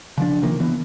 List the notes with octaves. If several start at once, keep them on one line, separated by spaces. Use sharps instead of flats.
C#3 F3 D4
C3 D#3 F3 A#3
E3 B3